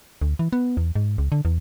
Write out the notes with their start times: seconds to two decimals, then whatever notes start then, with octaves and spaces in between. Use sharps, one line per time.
0.22 D2
0.39 E3
0.53 B3
0.77 E2
0.96 G#2
1.18 C#2
1.32 D3
1.45 E2